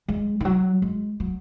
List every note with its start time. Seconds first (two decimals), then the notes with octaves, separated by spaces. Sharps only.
0.08 G#3
0.41 D#3
0.45 F#3
0.82 G#3
1.20 F#3